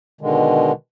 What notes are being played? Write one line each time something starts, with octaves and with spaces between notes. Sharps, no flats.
B2 D3 D#3 G#3